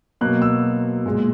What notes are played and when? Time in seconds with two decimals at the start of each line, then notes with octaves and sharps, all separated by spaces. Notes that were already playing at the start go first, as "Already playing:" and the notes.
0.21 B2 F#3 A#3 F#6
0.42 E6
1.06 A#2 G#3